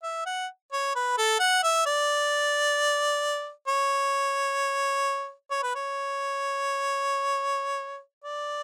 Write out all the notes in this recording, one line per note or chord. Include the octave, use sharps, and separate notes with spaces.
E5
F#5
C#5
B4
A4
F#5
E5
D5
C#5
C#5
B4
C#5
D5